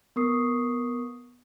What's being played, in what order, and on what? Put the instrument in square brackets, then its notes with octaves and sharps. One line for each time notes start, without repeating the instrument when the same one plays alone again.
[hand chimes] B3 A#4 C#6 D#6 C7